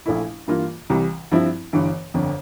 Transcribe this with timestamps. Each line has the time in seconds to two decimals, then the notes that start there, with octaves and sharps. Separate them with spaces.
0.06 A#1 A#2 A3 E4
0.48 G2 E3 A#3 F4
0.90 C2 C3 E3 G3
1.32 G2 F3 C4 E4
1.73 G1 G2 E3
2.14 G1 F2 D3